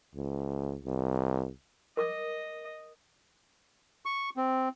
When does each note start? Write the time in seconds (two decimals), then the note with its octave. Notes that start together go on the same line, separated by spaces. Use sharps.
0.15 C#2
0.85 C2
1.97 A#4 D#5 D6 D#6
4.05 C#6
4.37 C4